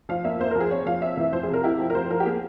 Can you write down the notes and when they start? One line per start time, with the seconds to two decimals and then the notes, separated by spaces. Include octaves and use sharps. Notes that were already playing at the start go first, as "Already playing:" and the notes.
0.09 F3 F5
0.25 A#3 E5
0.40 A#3 C5
0.51 A#4
0.55 F3
0.60 G#4
0.71 C4 C#5
0.86 F3 F5
1.02 C4 E5
1.17 E3
1.32 F3 C5
1.43 G#4
1.49 C3 A#4
1.63 E4 G4
1.79 F3
1.90 A#4
1.95 F3 C5
2.10 F3 A#4
2.20 G4
2.26 A#3 G#4